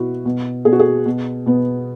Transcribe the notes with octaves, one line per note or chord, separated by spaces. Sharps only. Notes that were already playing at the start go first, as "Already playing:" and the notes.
Already playing: B2 E4 F#4
B2
B2 G#4
F#4
G#4
B2
B2 B3